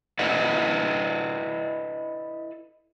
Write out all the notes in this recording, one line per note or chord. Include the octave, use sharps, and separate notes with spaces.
E4 A4 B4 D5 D#5